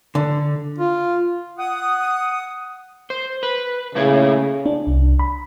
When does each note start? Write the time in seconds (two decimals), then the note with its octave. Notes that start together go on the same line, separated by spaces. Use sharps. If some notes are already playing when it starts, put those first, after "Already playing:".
0.15 D3
0.78 F4
1.58 F#5 D#6
3.10 C5
3.43 B4
3.95 A#2 C#3 A3 E4
4.66 D4
4.87 C2
5.19 B5